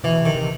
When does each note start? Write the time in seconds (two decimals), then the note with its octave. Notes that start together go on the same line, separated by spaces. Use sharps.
0.04 B2 E3
0.20 C3
0.25 D#3
0.35 C3